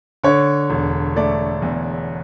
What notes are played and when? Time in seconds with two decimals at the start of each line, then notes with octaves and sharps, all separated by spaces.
0.24 D3 C#5
0.70 E1
1.16 A3 D5
1.62 E2